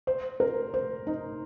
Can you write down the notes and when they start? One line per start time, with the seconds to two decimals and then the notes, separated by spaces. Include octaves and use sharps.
0.07 C5
0.40 A#4
0.74 C5
1.07 D#4